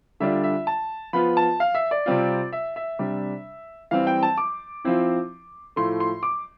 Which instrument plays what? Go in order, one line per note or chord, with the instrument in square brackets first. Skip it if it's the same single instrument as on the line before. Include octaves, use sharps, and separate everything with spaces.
[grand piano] D3 G3 D4 F4 E5
E5
A5
F3 B3 F4 B5
A5
F5
E5
D5
C3 G3 C4 F4
E5
E5
C3 G3 D4
E3 G3 C4 F5
G5
A5
D6
F3 C4 E4
A2 F3 A3 C6
C6
D6